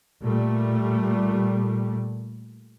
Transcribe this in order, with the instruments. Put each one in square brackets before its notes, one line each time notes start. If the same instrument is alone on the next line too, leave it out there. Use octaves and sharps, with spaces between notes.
[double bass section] A#2 G3 A3